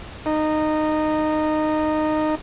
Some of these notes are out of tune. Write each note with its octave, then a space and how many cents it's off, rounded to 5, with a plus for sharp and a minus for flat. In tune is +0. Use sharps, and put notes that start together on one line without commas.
D#4 -15